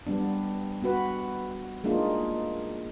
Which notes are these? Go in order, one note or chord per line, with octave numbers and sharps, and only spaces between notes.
G3 B3 D4
B3 F#4 B4
G#3 A#3 D4 D#4 F4